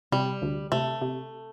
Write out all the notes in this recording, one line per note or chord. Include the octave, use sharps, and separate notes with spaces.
C3 G3
D2
C3 A3
C3